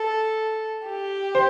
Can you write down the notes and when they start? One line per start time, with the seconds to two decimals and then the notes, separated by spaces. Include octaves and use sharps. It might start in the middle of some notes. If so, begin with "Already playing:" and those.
Already playing: A4
0.85 G4
1.35 C5